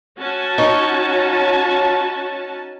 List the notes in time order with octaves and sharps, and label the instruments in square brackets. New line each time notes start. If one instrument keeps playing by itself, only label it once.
[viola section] C#4 F#4 A5
[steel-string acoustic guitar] D#4 C#5